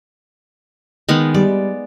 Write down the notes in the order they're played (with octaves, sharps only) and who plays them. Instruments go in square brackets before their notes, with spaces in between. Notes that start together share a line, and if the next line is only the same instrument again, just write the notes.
[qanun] D#3 G#3 B3
[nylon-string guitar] G3 [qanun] D5